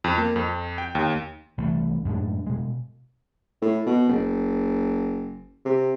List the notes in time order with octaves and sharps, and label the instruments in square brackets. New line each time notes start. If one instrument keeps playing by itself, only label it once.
[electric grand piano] F2
A#3
F2
G5
D#2
[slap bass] C2 E3 A3
F#2 A2 G#3 D4
B2 G#3
[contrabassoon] A2
B2
F#1
C3